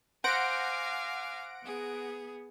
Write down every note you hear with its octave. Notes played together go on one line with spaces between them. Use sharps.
C5 F5 F#5 G#5 D6 A#6 D7
B3 G#4